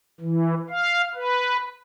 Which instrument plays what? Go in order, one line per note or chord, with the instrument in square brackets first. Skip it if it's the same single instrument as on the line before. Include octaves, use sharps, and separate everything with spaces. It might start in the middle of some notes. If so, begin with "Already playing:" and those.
[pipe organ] E3
F5
B4